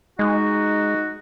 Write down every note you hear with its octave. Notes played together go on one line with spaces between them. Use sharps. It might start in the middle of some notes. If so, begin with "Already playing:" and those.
G#3 D#4 F#4